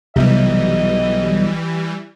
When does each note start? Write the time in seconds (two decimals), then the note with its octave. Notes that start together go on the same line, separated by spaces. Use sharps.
0.16 B1 C3 E3 G3 D#5